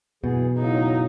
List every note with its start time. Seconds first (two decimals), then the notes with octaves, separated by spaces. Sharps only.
0.24 F#2 B2 E3 G#4
0.58 A2 C#3 F#3 D#4